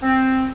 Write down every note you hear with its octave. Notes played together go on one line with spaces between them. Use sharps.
C4